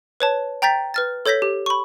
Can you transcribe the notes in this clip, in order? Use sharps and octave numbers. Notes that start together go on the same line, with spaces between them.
B4 C#5 A5
G5 A#5 G6 A6 B6
B4 F6 A6
A4 C#5 G6 A#6 B6
G4
B5 C#6